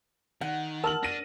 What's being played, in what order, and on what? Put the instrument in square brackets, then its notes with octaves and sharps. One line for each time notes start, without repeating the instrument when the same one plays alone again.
[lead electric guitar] D#3 [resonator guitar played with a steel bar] F#5
[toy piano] A#4 [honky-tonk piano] A5 F6 F#7
[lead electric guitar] D4 [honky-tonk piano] A#6 D#7